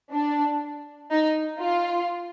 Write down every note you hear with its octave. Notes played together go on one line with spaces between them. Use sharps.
D4
D#4
F4